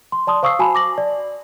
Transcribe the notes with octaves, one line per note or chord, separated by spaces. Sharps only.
C6
D5 A5 C6 D#6
C5 F5 C#6 D#6 E6 C7
F#4 G#5 A5 B5
D6 A#6 F#7
D5